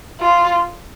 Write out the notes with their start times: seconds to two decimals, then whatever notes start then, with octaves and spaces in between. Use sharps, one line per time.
0.21 F4